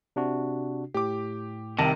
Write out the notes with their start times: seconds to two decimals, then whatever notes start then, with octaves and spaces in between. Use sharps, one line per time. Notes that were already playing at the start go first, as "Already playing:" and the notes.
0.16 C3 D4 F#4
0.94 A2 G4 D6
1.78 C2 C3 D#3 A5 A#6